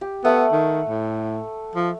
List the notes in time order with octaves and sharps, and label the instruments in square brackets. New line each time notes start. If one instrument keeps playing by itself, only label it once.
[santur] G4
[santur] A3 F#5 [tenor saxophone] B3
[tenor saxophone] D#3
A2
F3